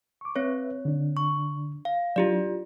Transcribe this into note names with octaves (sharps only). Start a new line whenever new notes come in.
C#6 D6
C4 B4 C#5 E5
D3 D4
C#6
F5
F#3 D4 E4 F4 G4 D5